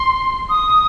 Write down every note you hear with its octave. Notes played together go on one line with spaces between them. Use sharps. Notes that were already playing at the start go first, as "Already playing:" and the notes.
Already playing: C6
D#6